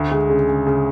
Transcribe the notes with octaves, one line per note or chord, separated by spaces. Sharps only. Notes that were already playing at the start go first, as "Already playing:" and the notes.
Already playing: D2
G#3
C#3
C#3
C#3